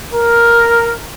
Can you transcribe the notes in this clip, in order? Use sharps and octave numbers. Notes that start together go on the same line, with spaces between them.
A#4